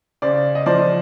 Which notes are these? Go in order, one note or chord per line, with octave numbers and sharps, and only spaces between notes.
C#3 C5 D5
D#5
F3 C5 D5